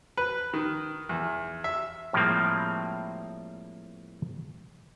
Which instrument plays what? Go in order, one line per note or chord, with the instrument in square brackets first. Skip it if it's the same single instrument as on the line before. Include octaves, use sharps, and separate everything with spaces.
[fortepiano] B4
D#3
E2
E5
[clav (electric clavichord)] A2 F3 G3 G#3 A#3 C4